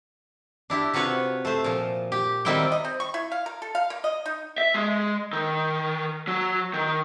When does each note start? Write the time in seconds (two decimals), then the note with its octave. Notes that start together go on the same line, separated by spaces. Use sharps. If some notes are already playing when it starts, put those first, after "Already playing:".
0.70 D4 E4 G4
0.94 C3 F4 F#4 B4 C#5 F#5
1.45 A3 C5
1.64 A#2 F3
2.12 G4
2.45 D#3 G3 C4 E4 F4 G5
2.72 D#5
2.85 C4
3.00 C#6
3.14 E4
3.32 F5
3.46 A#4
3.62 A4
3.75 F5
3.90 A#3
4.04 D#5
4.26 D#4
4.58 E5
4.74 G#3
5.33 D#3
6.27 F#3
6.73 D#3